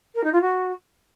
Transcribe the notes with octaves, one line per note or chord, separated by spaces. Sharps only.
A#4
D#4
F4
F#4